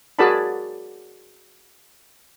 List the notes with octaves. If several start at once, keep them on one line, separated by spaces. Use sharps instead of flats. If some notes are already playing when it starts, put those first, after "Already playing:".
F#4 G#4 A#4 D5 A5 B5